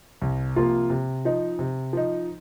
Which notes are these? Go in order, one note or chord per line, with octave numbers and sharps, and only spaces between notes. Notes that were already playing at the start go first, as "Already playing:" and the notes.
C2
C3 F3 A#3 F4
C3
F3 D#4
C3
F3 D#4